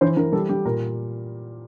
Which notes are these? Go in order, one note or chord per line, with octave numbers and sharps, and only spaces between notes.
E3 C5
E3 A#4
G3 A4
G3 G4
A#2 A#4